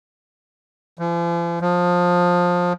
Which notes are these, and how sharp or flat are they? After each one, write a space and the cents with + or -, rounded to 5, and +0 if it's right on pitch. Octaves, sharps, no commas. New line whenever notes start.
F3 -45
F3 +20